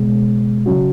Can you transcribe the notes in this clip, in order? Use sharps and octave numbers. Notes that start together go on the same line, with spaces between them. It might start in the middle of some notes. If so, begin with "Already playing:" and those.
Already playing: C#2 B2 G#3
C#3 F#3 C#4 F#4